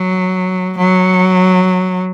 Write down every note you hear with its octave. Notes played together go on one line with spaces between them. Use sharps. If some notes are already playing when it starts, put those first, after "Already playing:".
Already playing: F#3
F#3